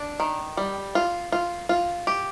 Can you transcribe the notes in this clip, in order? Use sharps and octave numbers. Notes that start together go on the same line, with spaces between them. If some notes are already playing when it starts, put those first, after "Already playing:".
Already playing: D4
D#3
G3
F4
F4
F4
G4